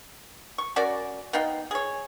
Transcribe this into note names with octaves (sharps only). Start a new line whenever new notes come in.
C#6
C#4 F#4 A#4 D5
B3 D#4 F5 G5
G#4 C#5